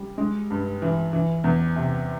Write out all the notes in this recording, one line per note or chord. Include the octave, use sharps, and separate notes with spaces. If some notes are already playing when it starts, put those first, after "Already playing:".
Already playing: G3
G#3
G2
E3
E3
E2
C3